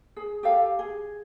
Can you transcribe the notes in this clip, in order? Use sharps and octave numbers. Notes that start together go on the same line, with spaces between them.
G#4
G4 A4 F5
G#4